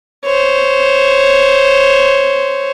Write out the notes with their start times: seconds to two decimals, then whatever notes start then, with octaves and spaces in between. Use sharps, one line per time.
0.25 C5 C#5